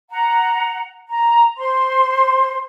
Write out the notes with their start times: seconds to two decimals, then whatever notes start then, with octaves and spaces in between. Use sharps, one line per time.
0.10 F#5 A#5
1.08 A#5
1.57 C5 C6